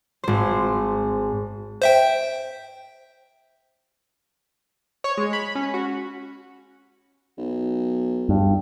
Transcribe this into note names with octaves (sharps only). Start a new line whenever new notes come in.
G#1 C5
C5 E5 G5
C#5
G#3
B5
C#4
F#4
B1
G2